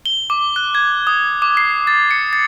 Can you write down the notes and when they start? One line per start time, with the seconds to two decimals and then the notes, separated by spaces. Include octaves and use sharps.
0.06 G7
0.30 D6
0.56 F#6
0.75 G#6
1.07 D#6
1.42 D6
1.57 C7
1.87 A6
2.11 C#7
2.33 A6